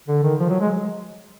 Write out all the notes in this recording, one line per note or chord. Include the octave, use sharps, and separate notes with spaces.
D3
D#3
F3
F#3
G#3